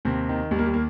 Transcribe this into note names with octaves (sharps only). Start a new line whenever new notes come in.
D#2 C3 C4
D#3
D#2 G3
A#3
G3
A#3